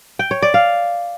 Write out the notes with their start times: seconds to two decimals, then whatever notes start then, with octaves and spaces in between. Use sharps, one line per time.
0.19 G5
0.31 C#5
0.42 D5
0.54 F5